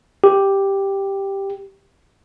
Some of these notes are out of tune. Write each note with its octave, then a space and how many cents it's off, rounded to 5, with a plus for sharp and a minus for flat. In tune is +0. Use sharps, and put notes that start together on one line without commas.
G4 +0